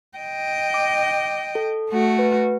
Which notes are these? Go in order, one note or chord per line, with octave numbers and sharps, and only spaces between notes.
D#5 G5
D6
A4
A3 F#4
B4